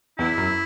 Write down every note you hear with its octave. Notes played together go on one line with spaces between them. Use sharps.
E2 E4
F#2